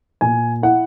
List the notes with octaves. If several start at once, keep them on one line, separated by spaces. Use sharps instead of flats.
A#2 G#5
E4 F#5